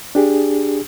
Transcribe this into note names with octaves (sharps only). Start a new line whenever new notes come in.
D4 G4 G#4